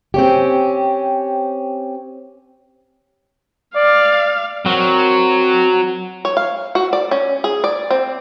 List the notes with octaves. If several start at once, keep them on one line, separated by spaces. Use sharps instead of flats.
C4 C#4 G4
D5 F5
F#3 C4 F#4 A#4
C#5
F5
F#4
D5
C#4
G#4
D5
C4